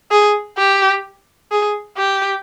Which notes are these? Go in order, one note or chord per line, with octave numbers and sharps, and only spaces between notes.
G#4
G4
G#4
G4